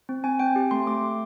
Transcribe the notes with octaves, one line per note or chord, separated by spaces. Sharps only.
C4
C4 G#5
C4 G5
G4
A3 C6
A3 D6
A3